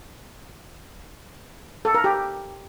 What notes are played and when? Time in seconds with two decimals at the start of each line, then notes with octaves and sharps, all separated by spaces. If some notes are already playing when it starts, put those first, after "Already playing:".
1.85 A4
1.95 A#4
2.04 G4